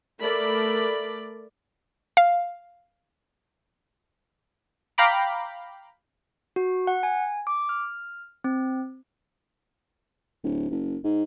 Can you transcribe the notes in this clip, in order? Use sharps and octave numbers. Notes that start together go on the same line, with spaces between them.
A3 A4 A#4 D5 B5
F5
F5 G5 A#5 B5 D6
F#4
F#5
G#5
D6
F6
C4
D1
F#1
G#2